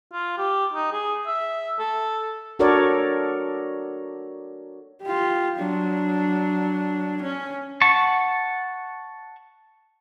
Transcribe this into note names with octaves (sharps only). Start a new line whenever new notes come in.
F4
G4
D#4
G#4
E5
A4
D4 F#4 A4 A#4 C#5 D5
F4 G4
F#3 D4
C#4
F#5 A5 C#6